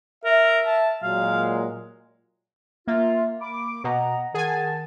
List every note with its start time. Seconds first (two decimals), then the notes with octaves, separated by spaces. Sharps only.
0.25 A#4 E5
0.66 A5
1.03 A#2 F#3 G#3 F5
2.87 A#3 F4 E5
3.41 B5 D6
3.84 B2 D#5 F#5 A#5
4.35 D#3 G#4 F#5 G#5 A5